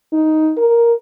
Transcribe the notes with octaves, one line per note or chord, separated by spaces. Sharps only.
D#4
A#4